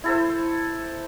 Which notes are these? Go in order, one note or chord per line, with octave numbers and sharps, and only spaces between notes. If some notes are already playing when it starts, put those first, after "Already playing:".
E4 A4 C5